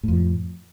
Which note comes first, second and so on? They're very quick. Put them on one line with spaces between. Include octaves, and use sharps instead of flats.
A2 F2 F3